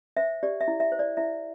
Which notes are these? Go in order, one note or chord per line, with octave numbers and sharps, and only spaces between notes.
C5 E5
G4 D5
E5
E4
E5
C5
D5
E4 E5